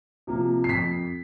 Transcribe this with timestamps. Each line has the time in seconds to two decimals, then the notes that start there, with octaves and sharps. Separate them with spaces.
0.27 C3 F3 A#3
0.64 C7
0.69 F2 B6